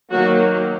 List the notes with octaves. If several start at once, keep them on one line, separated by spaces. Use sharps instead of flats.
D#3 F#3 A#3 F#4